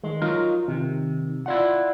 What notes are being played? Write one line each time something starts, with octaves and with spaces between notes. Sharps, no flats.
D#3 G#3
F#3 D#4 F4 A#4
C3 D#3
E4 F4 D5 F#5